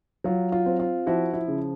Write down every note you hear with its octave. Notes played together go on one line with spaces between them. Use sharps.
F#3 F4
F4
C4
F4
F3 E4 F#4
E4
C#3